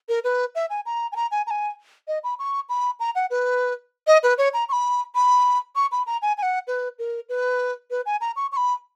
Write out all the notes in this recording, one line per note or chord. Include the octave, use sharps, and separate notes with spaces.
A#4
B4
E5
G#5
A#5
G#5
A#5
G#5
A#5
G#5
D#5
B5
C#6
B5
A#5
F#5
B4
D#5
B4
C#5
A#5
C#6
B5
B5
C#6
B5
A#5
G#5
G#5
F#5
B4
A#4
B4
B4
G#5
A#5
C#6
C#6
B5